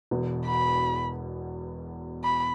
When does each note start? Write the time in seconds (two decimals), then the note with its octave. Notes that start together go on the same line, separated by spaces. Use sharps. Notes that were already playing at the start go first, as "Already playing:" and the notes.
0.11 E1 E2 B2
0.47 B5
2.24 B5